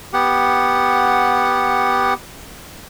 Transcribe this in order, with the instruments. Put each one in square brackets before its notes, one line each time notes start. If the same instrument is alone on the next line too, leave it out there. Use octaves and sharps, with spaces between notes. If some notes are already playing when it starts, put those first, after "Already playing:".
[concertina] B3 G4 F#5